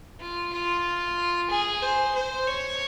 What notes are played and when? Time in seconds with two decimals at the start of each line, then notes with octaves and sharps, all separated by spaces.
0.20 F4
0.53 F4
1.50 G#4
1.82 C5
2.15 C5
2.48 C#5